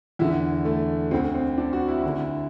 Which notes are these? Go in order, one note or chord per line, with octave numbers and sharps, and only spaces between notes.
E2 D3 E4
A3
D2 D3 C4
C4
D4
F#4
E4
D2 D3